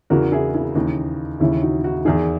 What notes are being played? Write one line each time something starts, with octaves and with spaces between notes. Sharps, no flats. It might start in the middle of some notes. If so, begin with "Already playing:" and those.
E2 C#3 E3 F#4 A#4
E4 G#4
E4 G#4
D#2 C#3 E3 D#4
D#2 C#3 E3 C#4 E4
D#4 F#4
D#4 F#4
E2 D#3 E4 G#4